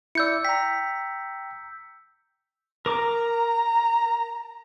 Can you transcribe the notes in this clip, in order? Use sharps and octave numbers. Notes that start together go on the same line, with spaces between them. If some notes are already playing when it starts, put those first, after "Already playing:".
E4 D5 E6 G6 C#7
G5 A#5 B6
A#4 A#5 D6